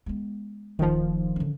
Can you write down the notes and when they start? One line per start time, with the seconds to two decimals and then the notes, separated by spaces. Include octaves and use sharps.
0.06 G#3 B3
0.79 D#1 D#3 F3 D#4
1.36 D3 C#4